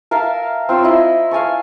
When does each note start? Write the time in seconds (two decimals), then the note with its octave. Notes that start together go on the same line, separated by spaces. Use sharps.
0.11 A#4 E5 F5 A5
0.69 C4 F4 C#5 E6
0.83 E4 D#5 B5 C6
1.31 F5 G#5 A5 C#6